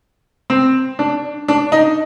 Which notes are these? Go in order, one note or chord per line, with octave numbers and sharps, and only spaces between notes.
C4
D4
D4
D#4